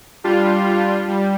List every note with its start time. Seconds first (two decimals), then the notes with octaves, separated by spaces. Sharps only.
0.24 G3 D4 F4
1.08 G3